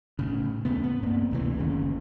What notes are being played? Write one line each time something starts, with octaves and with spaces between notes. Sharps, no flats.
A2 C#3
E2 A2 C#3 B3
B3
G2 A#3 C4
D2 C3 E3
F#1 D#2 C#3